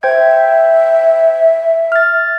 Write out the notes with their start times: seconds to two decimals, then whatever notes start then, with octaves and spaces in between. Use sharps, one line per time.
0.03 C5 E5 G5 G#6
1.92 F6 A6